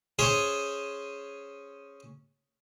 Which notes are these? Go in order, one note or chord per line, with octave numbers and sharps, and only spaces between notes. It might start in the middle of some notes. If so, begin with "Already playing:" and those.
C#4 G#4 C5 C#5